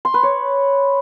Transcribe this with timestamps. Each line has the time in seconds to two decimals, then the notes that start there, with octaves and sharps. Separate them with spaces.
0.05 C6
0.14 B4
0.23 C#5